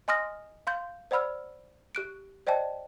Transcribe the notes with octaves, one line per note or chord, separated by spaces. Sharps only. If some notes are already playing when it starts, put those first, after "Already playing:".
D#5 G#5 C6 D#6 F6 A#6
F5 C6 G6
C5 D5 F#5 B5 E6 F6
G4 F#6 D7
C5 D5 D#5 G5 A5